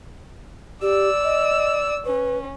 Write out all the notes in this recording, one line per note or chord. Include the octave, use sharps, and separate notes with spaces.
G4 D5 E6
D#5
C#4 B4